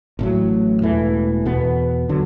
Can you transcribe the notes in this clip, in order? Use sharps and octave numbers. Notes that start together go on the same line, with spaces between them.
A1 A2 F#3
E1 E2 E3 A3
E2 B2 B3
D3 F#3